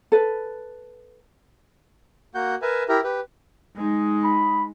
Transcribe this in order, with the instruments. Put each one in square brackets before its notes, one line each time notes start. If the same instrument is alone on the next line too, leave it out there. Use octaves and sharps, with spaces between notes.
[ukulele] A4 B4
[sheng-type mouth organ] A#3 F#4 F#5 G6
A#4 B4 E5 G#5
E4 G4 A#4
G4 B4
[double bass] G#3 D#4
[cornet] B5